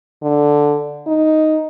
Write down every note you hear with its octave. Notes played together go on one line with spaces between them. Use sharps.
D3
D#4